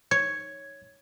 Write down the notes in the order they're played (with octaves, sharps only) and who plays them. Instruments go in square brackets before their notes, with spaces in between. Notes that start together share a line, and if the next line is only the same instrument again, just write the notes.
[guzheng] C#5 [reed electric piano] G#6